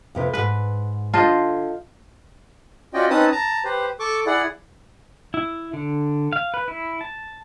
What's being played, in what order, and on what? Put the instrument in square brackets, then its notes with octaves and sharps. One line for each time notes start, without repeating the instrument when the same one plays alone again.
[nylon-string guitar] F2 C3 B4
[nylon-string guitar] D2 G#2 [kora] B4
[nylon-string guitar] D3 C#5 A5 [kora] F4 C5 D#5
[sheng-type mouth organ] C#4 F4 F#4 D5 D#5 G5
C4 C#4 D#4 B4 A5 D#6
A5 A#5
G4 B4 C5
A4 C#6 D6
E4 G#4 D5 F#5
[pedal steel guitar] E4
D3
F5
B4
E4
A5